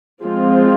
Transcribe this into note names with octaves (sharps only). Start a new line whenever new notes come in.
F3 G#3 C4 F4